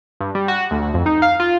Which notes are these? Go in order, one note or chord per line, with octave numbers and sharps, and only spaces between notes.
G2
G3
F#4
D2
F2
D#4
F5
F4